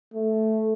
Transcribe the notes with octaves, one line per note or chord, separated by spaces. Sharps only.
A3